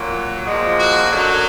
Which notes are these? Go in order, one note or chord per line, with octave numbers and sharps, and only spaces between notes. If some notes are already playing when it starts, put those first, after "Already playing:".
Already playing: A#2 F#3
A#2 F3 G#3
F#4
F#2 D3 F#3